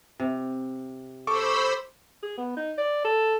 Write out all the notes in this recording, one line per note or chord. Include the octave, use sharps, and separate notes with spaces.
C3
A4 C5 B5 C#6 D6 E6
G#4
B3
D#4
D5
A4